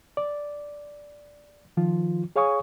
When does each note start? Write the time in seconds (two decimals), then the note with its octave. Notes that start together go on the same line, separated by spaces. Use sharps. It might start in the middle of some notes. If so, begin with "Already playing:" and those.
0.17 D5
1.77 D#3 F3 F4
2.36 G#4 C#5 F5 G#5 C#6 D#6